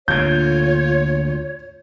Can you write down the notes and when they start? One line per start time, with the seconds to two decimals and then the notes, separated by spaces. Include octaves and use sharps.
0.08 D2 A#2 D3 F4 C#5 G6 G#6